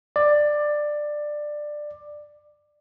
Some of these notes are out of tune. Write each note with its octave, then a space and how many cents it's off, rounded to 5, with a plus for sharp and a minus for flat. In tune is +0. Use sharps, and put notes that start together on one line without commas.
D5 +15